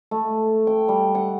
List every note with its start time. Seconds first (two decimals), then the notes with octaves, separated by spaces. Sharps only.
0.11 A3
0.67 G5
0.88 G3
1.15 F#5